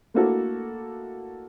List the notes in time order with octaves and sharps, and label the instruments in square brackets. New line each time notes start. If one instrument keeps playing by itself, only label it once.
[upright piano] A3 A#3 D4 E4 F#4 A4